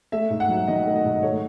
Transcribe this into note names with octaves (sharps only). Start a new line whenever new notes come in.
A3 E5
G#2
F#5
F#3
D#3 D#5
A3
D#5
G#2
A3 C#5